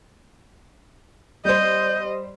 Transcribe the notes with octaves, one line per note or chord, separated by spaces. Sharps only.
G3 C5 D#5 G6